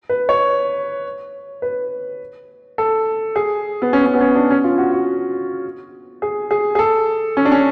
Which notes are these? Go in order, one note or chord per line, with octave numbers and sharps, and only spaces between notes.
B4
C#5
B4
A4
G#4
B3
C#4
C#4
B3
C#4
D4
C#4
F4
F#4
F#4
G#4
G#4
G#4
A4
C#4
D4
C#4